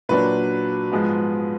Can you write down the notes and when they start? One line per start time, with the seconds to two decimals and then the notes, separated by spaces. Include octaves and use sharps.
0.09 A#2 F#3 D4 B4
0.92 G#2 F3 G#3 B3